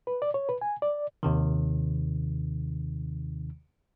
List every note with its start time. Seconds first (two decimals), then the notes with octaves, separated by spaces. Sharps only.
0.07 B4
0.22 D5
0.34 C#5
0.49 B4
0.61 G#5
0.82 D5
1.23 D#2 C3 D#3